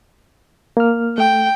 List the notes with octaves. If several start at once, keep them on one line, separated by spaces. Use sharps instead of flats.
A#3 F6
A3 G5